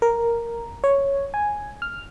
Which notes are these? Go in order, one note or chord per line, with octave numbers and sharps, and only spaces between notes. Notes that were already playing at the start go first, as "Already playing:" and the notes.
A#4
C#5
G#5
F6